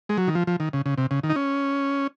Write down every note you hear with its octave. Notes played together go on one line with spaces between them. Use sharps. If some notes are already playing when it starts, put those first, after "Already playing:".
G#3
F#3
D#3
F3
F3
D#3
C#3
C#3
C3
C#3
D#3
D#4
C#4